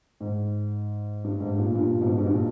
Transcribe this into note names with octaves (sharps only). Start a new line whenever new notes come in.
G#2
G2
G#2
G2 A#2
G2 A#2
G#2 B2
G2
G#2
G2 A#2